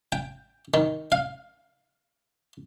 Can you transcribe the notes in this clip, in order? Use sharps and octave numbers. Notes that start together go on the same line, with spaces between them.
G5
D#3
F5